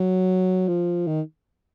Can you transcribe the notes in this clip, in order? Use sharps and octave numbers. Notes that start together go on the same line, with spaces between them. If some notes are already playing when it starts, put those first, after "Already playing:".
Already playing: F#3
F3
D#3